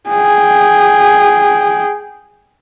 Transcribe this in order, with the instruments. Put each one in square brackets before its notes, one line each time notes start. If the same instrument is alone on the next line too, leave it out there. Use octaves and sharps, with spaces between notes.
[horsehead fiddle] G#4 G5